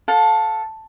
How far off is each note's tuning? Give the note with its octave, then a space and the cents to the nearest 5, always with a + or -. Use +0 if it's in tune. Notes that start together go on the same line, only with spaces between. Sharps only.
A4 +0 F5 +35